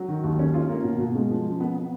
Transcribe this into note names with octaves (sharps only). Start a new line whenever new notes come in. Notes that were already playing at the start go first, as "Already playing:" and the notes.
Already playing: F#3
D#3
D#2
C#4
F4
A#3
B2
B2
G#3
F3
F#2
B3
B3